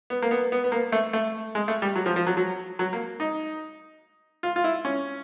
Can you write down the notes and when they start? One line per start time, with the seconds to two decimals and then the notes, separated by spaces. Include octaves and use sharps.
0.10 B3
0.22 A#3
0.31 B3
0.52 B3
0.64 B3
0.72 A#3
0.92 A3
1.13 A3
1.55 G#3
1.68 A3
1.82 G3
1.96 F#3
2.06 F3
2.16 F3
2.27 F#3
2.37 F#3
2.79 F#3
2.93 A#3
3.20 D#4
4.43 F4
4.56 F4
4.64 E4
4.85 C#4